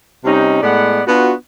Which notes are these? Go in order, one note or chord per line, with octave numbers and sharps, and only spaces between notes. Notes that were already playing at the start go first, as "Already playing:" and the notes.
C3 G3 C#4 D#4
A2 G#3 B3 D5 F#5
B3 D4 F4 F#4